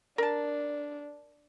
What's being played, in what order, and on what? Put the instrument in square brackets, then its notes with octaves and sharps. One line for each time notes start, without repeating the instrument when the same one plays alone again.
[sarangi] D4 [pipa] A#4 A5